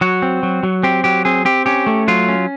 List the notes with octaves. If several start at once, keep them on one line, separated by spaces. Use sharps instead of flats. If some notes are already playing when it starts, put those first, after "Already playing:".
F#3 F#4
C4
F#3
F#3
C4 G4
F#3 G4
C4 G#4
C4 G4
C#4 G4
A3
F#3 F4
C#4